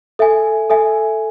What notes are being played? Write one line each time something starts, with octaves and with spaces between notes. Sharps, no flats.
A4 E5 G#5
A4 E5 G#5